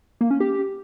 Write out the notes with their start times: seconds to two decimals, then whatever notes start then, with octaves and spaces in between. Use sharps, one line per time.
0.21 A#3
0.31 C#4
0.40 G4